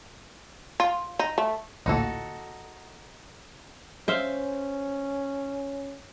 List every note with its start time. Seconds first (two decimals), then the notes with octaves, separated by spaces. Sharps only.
0.80 F4
1.19 D#4
1.38 A3
1.86 A1 D2 A#2 D#4 F#4 A4
4.08 C#4 C5 E5 F5